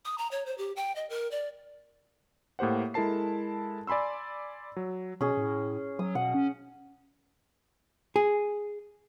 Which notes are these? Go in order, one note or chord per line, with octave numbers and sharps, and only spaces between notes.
D#6
A#5
C#5
C5
G4
G5
D#5
A#4
D5
A2 A#3 G4 C5 F#5
G#3 E4 A4 A#4 A5 C7
D5 G#5 B5 C6 E6
F#3
B2 C#4 G#4
A2
F#3 D#6
B2 F#5
C#4
G#4